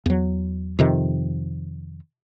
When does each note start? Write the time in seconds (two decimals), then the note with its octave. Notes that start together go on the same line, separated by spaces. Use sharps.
0.06 E2 F#3
0.79 F2 C3 D#3